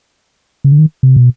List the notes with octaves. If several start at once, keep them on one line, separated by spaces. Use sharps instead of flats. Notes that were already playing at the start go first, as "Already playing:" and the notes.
C#3
D3
D#3
C3
B2